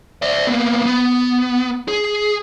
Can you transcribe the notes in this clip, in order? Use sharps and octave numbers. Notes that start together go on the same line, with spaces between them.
D5 E5
A#3 B3
B3
G#4